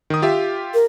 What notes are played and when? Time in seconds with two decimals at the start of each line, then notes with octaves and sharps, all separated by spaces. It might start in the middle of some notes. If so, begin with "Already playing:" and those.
0.10 D#3 D#6
0.22 F4 G4 E5
0.74 A#4